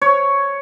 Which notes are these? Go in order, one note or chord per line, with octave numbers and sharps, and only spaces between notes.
C#5